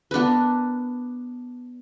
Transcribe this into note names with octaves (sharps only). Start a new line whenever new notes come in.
B3 D4 A#4 B4